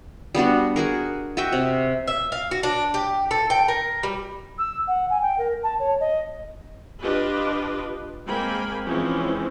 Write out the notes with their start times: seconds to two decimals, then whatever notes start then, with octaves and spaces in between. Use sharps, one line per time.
0.35 G3 B3 D4 F#4
0.76 F#4 G#4 A#4
1.37 F#4 D#5 E5 G5
1.52 C3
2.08 E5
2.32 F5
2.51 F#4
2.63 D4
2.94 G4
3.31 A4
3.50 G5
3.68 A#4
4.03 G3
4.59 E6
4.88 F#5
5.10 G#5
5.22 G5
5.38 A#4
5.63 A5
5.79 C#5
6.00 D#5
7.02 D4 F4 G4 B4 D#5
8.27 G#3 A#3 C4 G5 G#5 B5
8.84 E3 F3 G#3 C4 C#4